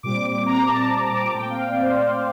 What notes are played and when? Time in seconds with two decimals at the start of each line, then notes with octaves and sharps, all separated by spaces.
0.03 A#2 G3 C4 D6
0.46 A#5
0.68 A5
1.33 A#2 A3 C4 G5
1.50 F5
1.67 D5
1.82 C5
1.99 D5